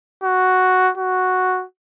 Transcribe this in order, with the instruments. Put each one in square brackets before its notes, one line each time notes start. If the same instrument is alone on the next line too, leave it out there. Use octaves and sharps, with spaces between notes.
[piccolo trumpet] F#4
F#4